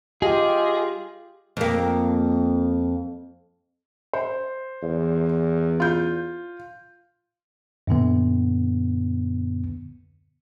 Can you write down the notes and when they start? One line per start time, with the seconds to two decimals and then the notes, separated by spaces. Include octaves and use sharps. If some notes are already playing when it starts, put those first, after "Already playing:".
0.22 F4 G4 G#4 D#5
1.57 F2 A#3
4.13 C5
4.83 E2
5.80 F4 G6
7.87 F#2 A#2 D3 B3